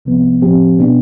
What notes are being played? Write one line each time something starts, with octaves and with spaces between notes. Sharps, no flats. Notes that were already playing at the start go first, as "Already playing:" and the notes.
C2 C3 F3 B3
A2 F3 C4 G4
B2 B3 D4